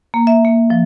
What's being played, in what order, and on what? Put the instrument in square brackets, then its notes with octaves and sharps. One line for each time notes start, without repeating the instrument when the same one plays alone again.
[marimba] A#3
E5
A#3
F3